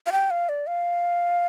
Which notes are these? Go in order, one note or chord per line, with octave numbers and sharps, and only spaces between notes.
F5
G5
F5
D5
F5